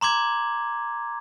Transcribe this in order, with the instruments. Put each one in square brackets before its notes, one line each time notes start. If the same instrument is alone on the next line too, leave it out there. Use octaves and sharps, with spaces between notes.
[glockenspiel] A#5 C6 D6 G#6